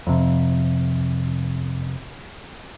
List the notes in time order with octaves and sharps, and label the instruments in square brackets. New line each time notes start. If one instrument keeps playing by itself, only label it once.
[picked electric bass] F2 C3